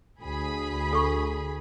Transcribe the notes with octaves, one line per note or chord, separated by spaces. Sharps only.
D2 G#4 B5
A4 C#6